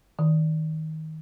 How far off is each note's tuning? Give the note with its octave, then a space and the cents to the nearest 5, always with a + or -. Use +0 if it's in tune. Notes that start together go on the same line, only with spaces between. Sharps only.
D#3 +20